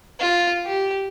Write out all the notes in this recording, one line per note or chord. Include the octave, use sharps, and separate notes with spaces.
F4
G4